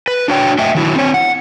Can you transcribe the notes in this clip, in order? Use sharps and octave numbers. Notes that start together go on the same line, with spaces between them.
B4
D4 F#4 C#5 G5
A3 D#5 E5 G5
D#3 F#3 E4
C4 C#5
F#5